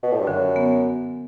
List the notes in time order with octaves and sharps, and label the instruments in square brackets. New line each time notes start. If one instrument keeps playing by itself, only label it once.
[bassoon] B2
A2
G2
[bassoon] F#2 [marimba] D3
[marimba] B3